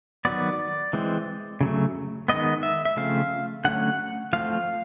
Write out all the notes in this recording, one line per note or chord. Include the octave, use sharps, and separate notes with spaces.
D#3 F#3 B3 D5
E3 G#3 C4
C#3 F#3 A3
D#3 G#3 B3 D#5
E5
E5
C#3 F3 A3 C4 F5
D3 F#3 A3 C#4 F#5
F3 A3 C4 F5